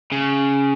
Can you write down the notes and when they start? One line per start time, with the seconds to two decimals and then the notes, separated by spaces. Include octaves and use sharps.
0.12 C#3